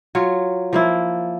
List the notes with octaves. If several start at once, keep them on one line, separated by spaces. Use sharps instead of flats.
F#3 F4 C#5
F3 A#3 E4